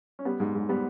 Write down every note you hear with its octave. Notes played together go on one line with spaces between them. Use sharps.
C#4
G3 B3
G#2
G#2
G3 B3